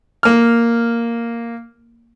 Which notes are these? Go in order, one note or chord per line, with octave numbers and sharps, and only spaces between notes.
A#3 F6